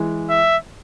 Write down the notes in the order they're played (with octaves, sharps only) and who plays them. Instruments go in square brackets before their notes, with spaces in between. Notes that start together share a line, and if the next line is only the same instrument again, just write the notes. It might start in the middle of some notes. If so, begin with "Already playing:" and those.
Already playing: [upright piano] E3 G#3
[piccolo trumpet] E5